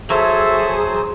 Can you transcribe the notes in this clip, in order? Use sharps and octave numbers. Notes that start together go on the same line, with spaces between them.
F#3 G#4 A4 C5 E5